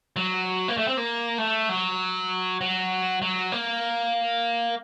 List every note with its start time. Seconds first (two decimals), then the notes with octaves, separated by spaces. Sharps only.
0.16 F#3
0.68 A#3
0.77 A3
0.88 C4
0.97 A#3
1.38 A3
1.69 F#3
2.61 F#3
3.22 F#3
3.52 A#3